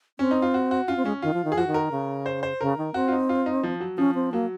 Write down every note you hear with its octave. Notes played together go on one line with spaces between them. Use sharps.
C4 C#4
D#4
F4
F#4
F#4
C#4 F4
C4
G#3 C#4
D#3 F4
F3
D#3
G#4
F3 F#4
D#3
A#4
C#3
C5
C5
C#3 A#4
D#3
C4 F#4
F4
D#4
F4
D#4
F3
F#3
F3 C#4
C4
F#3 A#3